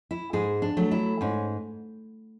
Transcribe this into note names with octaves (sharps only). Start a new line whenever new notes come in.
E4
G#2 G#4
D4
F#3 A3
E4
G#2 C#4